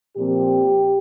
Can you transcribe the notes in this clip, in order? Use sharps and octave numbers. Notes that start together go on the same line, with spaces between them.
A#2 F3 C4 G4